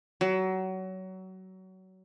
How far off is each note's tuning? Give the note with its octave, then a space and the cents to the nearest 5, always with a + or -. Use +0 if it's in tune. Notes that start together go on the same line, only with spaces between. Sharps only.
F#3 +25